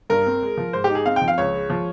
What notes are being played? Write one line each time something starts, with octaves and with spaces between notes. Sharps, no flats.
G2 A#4
C4
G#3
F3
G#2 C5
G4
D#4
G#4
C4 F5
G5
F3
F5
C#2 C#5
G#3
F3